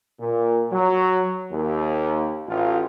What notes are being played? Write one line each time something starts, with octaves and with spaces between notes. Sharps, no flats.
A#2
F#3
D#2
A1 F4